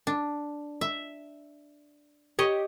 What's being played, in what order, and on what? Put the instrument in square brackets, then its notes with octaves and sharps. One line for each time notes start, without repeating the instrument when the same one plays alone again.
[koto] D4
E5
[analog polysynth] G4 [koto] C#5 D#5